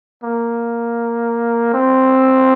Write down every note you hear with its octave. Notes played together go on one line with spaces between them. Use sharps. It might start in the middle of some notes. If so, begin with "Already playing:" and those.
A#3
C4